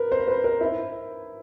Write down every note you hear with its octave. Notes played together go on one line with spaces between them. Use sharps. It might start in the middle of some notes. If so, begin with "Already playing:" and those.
Already playing: A#4 B4
C5
B4
A#4
E4